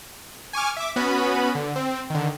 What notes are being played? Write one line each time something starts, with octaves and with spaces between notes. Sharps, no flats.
G#5 C#6 D6 F6
E5 D6
B3 C#4 F#4 B4 B5
D3
C4
D3 D#3